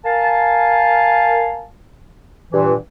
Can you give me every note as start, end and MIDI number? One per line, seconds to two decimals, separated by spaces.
0.05 1.64 70
0.05 1.64 77
0.05 1.64 80
0.05 1.64 81
2.52 2.74 43
2.52 2.74 46
2.52 2.74 52